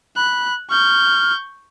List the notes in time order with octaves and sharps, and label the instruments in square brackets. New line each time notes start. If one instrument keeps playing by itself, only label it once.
[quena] B5 [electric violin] F#6
[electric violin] C#6 G6 [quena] F6